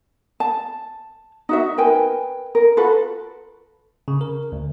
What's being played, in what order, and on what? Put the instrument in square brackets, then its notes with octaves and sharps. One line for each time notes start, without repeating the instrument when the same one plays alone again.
[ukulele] A5
D#4 F#4 E5
A#4 B4 G5 G#5
A#4
F4 F#4 A4 B4
[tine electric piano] C#3
A#4
D2